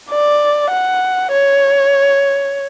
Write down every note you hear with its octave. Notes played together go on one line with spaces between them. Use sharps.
D5
F#5
C#5